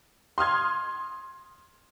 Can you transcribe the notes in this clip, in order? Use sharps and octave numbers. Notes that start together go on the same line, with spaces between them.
C6 D#6 F6 G#6